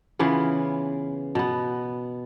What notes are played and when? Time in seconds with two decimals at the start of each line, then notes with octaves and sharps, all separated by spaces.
0.19 C#3 E3 B3 F4
1.35 B2 B3